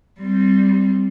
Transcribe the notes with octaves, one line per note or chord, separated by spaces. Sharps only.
G3 C4